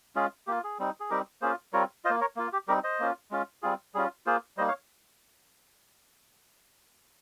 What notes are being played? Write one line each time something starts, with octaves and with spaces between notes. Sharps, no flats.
G#3 C#4 F4 G#4
A#3 F4 G4
G#4
G3 C4 D#4
G#4
G3 C4 D#4 G4 A#4
A#3 C#4 F4 G#4 C5
G3 C4 F4 A#4 C#5
F4 C5 D#5
A#3
A#4 C#5
A#3 F4
G4
G3 C4 D#4 G4 A#4
C5 D#5
A#3 C#4 F4
G#3 C#4 F4
G3 C4 F4 G#4
G3 C#4 F4 G#4
A#3 F4 G#4 C5
G3 A#3 D#4 C5 D#5
C#5 F5